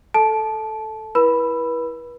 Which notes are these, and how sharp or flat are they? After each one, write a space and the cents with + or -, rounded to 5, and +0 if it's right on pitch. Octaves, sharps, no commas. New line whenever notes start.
A4 +0 A5 -20
E4 +0 B4 -35 B5 +0